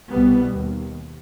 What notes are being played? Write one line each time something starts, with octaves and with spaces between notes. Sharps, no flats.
C2 B2 G3 B3
D#2